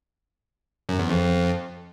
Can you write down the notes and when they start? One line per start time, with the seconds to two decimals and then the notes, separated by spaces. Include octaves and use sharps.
0.89 F#2
0.99 E2
1.09 F2